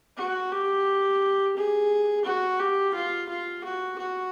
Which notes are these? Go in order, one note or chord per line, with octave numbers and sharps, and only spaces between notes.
F#4
G4
G#4
F#4
G4
F4
F4
F#4
F#4